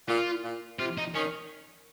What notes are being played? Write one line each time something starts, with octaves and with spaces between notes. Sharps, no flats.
A#2 F4
A#2
C3 F4
D#4
D#3 C#4